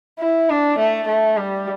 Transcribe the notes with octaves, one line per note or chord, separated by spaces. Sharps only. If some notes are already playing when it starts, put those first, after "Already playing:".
E4
D4
A3
A3
G3